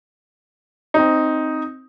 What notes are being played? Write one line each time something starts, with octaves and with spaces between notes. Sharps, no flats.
C4 D#4